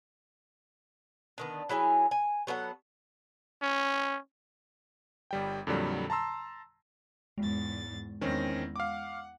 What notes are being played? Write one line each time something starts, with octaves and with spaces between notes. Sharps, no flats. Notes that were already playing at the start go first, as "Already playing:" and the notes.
D3 D#3 B3
F#3 E4 G#4 G#5
G#5
F#3 B3 A4 F#5
C#4
G1 G3 G5
F2 A#2 D3 F#3 G3
A5 A#5 C6 E6
E2 G#2 G#3 A6
E2 D#3 C4 C#4 A#6
F5 F#5 D6